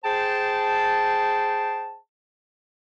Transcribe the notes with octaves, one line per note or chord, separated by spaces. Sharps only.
G#4 C5 G5 A5